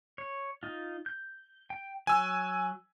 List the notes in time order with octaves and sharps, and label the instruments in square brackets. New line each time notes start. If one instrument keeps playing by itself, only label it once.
[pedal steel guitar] C#5
D#4 F4
G6
G5
[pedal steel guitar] F#3 [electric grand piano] G#5 E6